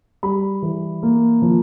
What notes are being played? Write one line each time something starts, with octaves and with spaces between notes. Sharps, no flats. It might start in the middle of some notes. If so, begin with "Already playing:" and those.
G3 B5
E3
A#3
F3